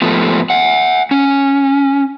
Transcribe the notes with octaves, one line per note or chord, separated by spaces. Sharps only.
G#2 F3 A3 B3
E5 F#5
C#4